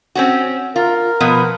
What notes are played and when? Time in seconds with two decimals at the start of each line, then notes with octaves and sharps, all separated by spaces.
0.15 C4 C#4 F#4
0.76 F4 A#4
1.21 B2 F3 B3